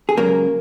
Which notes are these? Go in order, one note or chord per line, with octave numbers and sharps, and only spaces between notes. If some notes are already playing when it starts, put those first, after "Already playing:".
G#4
C#2 C#3 F#3 A#3 A#4